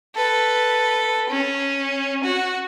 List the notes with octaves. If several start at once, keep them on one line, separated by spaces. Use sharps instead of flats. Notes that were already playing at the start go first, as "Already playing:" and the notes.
A4 B4
C#4
F#4